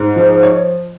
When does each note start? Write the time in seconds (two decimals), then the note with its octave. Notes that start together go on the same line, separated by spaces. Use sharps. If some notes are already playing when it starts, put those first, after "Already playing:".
Already playing: G#2
0.16 F3
0.43 C#5